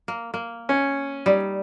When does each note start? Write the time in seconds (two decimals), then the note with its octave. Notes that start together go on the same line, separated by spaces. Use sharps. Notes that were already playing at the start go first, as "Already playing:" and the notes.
0.08 A#3
0.34 A#3
0.69 C#4
1.26 G3 D#4